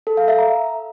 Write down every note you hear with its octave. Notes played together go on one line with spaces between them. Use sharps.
A4
F5
E5
A#5